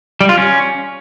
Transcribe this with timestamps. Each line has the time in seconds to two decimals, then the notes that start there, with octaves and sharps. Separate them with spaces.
0.21 G3
0.29 F4
0.38 C#4